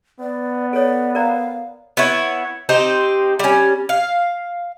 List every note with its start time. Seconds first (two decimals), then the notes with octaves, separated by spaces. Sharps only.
0.20 B3 D5
0.73 A4 C#5 D5
1.15 A#4 D5 F5 A#5
1.97 B3 E4 C#5
2.69 C4 D#4 G4 C5
3.39 G3 C#4
3.89 F5